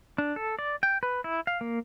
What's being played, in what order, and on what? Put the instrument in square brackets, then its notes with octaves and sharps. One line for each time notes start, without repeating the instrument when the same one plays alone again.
[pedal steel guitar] D4
A4
D5
G5
B4
E4
F5
A#3